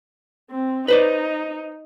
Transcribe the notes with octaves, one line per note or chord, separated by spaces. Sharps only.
C4
D#4 B4 C5 D5